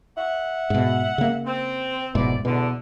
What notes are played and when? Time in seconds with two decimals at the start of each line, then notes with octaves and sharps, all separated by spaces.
0.17 E5 F#5
0.70 G#2 B2
1.18 C#3 A#3
1.46 C4
2.15 F1 G#2 B2 E4 C5 D5
2.45 E2 B2 D3